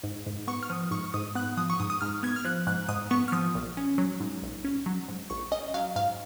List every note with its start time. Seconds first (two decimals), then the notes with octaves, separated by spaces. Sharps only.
0.04 G#2
0.26 G#2
0.47 B3 C#6
0.63 F6
0.70 F3 D#6
0.91 G#2 C#6
1.14 G#2 D#6
1.35 B3 F#6
1.57 F3 D#6
1.70 C#6
1.80 G#2 D#6
1.90 D#6
2.01 G#2 F6
2.23 B3 G#6
2.36 F6
2.45 F3 F#6
2.67 G#2 F#6
2.88 G#2 D#6
3.11 B3 C#6
3.28 F6
3.32 F3 D#6
3.55 A#1
3.77 C#4
3.98 F#3
4.20 G#2
4.42 A#1
4.65 C#4
4.86 F#3
5.08 G#2
5.30 A#1 C#6
5.51 C#4 D#5
5.74 F#3 F5
5.96 G#2 F5